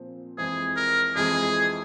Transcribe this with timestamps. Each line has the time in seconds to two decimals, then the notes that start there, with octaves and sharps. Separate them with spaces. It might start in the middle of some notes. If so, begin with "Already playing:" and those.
Already playing: A#2 F3 C4
0.38 F2 E3 G#3 C4 G#4
0.76 A#4
1.15 F2 E3 G#3 C4 G#4